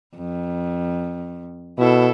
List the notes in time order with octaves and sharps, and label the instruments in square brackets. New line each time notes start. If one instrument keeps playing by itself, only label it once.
[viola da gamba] F2
[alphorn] B2 [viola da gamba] E4 A4